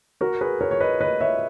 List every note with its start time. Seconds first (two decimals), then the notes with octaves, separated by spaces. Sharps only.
0.21 F#4 A#4
0.41 G#4 B4
0.61 A#4 C#5
0.71 C#5
0.80 B4 D#5
1.01 B4 D#5
1.21 C#5 E5